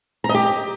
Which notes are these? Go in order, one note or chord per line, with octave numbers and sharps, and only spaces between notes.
A#5
D#5
G4